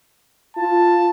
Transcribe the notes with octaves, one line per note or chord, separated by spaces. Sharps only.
F4 A5